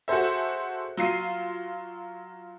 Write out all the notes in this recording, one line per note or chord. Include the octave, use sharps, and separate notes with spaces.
F#4 G#4 A4 C5 E5
F#3 F4 C7 D#7